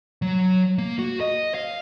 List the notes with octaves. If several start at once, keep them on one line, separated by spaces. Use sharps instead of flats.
F#3
A#3
F#4
D#5
F5